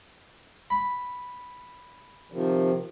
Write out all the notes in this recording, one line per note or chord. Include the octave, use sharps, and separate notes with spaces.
B5
C3 D#3 F3